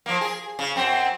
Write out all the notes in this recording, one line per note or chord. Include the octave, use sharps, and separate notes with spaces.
F3 A#3
G#4
C#3
F#2 C4